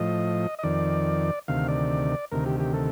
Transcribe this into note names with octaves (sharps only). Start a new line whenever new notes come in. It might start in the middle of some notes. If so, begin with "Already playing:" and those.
Already playing: A2 F3 D#5
D#5
F2 D#3 D5
D2 C3 D#3 F5
D5
D2 C3 D#3 A#4
G4
G4
A4